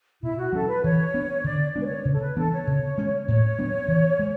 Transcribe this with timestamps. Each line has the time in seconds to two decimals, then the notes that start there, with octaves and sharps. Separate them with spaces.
0.23 B2 E4
0.38 F#4
0.53 F#3 C#4 A4
0.68 B4
0.83 E3 C#5
1.14 B3 D4
1.44 D3 D5
1.76 G#3 B3 D4 B4
1.85 C#5
2.05 C#3
2.14 A4
2.20 B4
2.36 E3 B3 D4 A4
2.51 C#5
2.67 C#3
2.98 G#3 C#4
3.28 A2 C#5
3.59 F#3 B3 D4
3.88 E3
4.19 G#3